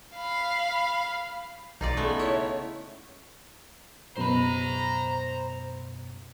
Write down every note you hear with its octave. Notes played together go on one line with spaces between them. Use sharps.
F5 B5
B1 D#4 F4 D5
C#3 A3 B3
E4 C#5
C#2 F#2 B2 C5 A#5 B5